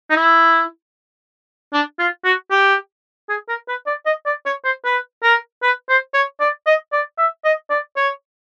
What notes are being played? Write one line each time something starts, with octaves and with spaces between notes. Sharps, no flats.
D#4
E4
D4
F4
F#4
G4
G#4
A#4
B4
D5
D#5
D5
C#5
C5
B4
A#4
B4
C5
C#5
D5
D#5
D5
E5
D#5
D5
C#5